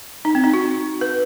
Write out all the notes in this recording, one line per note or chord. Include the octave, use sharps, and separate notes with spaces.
D#4
C4
D#4
F#4
B4